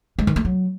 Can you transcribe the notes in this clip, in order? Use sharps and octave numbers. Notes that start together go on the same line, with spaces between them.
G#3
D#3
A3
F#3